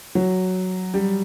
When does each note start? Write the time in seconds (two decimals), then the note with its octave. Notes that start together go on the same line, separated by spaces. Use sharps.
0.15 F#3
0.94 G3